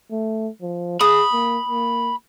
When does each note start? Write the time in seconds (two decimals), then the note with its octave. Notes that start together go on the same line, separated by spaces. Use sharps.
0.11 A3
0.62 F3
1.01 G#4 B5 D#6
1.33 A#3
1.69 A#3